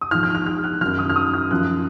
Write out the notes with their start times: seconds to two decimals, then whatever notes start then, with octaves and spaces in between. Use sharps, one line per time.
0.01 D#6
0.11 G#2 F3 F6
0.23 F6
0.35 F6
0.46 F6
0.64 F#6
0.81 F#2 D#3 F#3 F6
0.99 D#6
1.10 F6
1.16 D#6
1.34 F6
1.51 F#2 F3 F#6